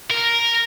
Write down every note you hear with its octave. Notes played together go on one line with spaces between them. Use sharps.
A#4